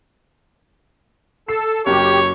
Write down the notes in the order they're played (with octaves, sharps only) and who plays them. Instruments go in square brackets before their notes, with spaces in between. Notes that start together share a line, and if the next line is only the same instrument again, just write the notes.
[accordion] A4 E6 [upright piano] C7
[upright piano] F#1 F#3 [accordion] G4 [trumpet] C#5